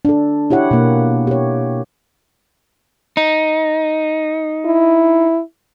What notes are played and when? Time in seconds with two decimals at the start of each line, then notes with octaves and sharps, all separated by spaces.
0.05 D4 A4
0.50 E4 G4 C#5 F#5
0.71 B2 A#3
1.27 G4 C#5
3.17 D#4
4.66 E4